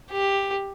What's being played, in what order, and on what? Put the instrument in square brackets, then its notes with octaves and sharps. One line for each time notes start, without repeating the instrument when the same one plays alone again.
[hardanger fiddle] G4